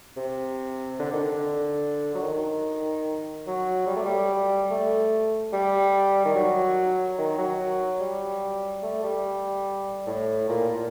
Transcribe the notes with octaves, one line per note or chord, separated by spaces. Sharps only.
C3
D3
D#3
D3
F#3
D#3
F#3
G3
A3
G3
A3
G3
D#3
F#3
D#3
F#3
G3
A3
G3
A2
A#2
A#2